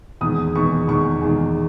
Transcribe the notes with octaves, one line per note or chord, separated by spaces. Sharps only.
E2 D#3 G#3 D#6
E2 D#3 G#3 C#6
E2 D#3 G#3 C#6
E2 D#3 G#3